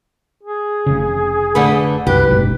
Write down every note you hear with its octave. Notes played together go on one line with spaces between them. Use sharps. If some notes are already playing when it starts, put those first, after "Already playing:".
G#4
F1 C#3
D3 A3 B4
C2 F#2 G4 B4
F#1 B1 G#2